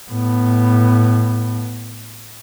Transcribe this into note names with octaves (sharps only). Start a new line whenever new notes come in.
A2 B3